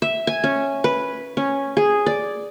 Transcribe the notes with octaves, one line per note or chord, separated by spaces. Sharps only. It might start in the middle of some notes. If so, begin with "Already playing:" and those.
E5
G#5
C#4
B4
C#4
G#4
D5